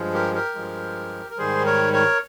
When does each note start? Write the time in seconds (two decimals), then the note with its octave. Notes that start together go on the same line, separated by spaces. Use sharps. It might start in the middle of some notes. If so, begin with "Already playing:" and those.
Already playing: G2 F3 G#3
0.14 G4 A#4
0.35 G4 A#4
0.55 G2 F3 G#3
1.30 A#4
1.38 G#2 D#3 G3 G#4 C5
1.65 A#4 C#5
1.93 A#4 C#5